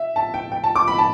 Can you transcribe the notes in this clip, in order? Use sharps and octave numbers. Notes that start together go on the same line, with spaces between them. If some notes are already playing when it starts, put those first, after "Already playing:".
Already playing: E5
A5
G5
G5
A5
D6
B5
A5